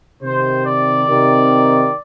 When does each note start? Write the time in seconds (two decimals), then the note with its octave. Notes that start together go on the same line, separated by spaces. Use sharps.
0.22 C3 D#3 C5
0.65 D5
1.08 C3 D#3